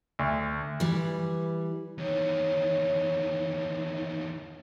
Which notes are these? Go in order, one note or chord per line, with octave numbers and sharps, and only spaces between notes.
D2
E3 G3
E2 D#3 C#5